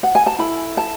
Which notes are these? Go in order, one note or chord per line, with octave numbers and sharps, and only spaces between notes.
F#5
G#5
A5
E4 A4 B5
A5